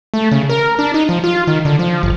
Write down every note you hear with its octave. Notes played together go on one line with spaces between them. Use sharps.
A3
C#3
A#4
D4
D#4
F3
F4
D#3
D3
F3
G1